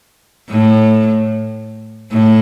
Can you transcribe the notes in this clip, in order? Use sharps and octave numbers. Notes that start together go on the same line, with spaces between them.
A2
A2